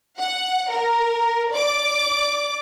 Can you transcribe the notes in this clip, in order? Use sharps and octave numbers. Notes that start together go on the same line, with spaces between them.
F#5
A#4
D5 D6